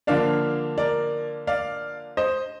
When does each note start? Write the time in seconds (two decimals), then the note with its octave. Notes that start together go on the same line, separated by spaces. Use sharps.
0.07 D3 F3 A#3 D4 D5 F5
0.78 A#4 D5
1.47 D5 F5
2.17 C5 D#5